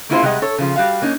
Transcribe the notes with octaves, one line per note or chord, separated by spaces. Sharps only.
A#3 C#4 E4 F4 G#4 C5
C3 G3 G#3 G#4 D#5 F#5
A4 C#5
C#3 F3
G3 F#4 F5
A#3 C#4 D#4